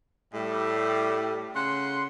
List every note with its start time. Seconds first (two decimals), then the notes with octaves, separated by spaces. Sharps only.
0.34 A2 G3
1.55 C#3 F#5 C6